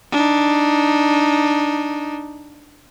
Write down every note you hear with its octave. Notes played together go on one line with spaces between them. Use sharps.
D4 D#4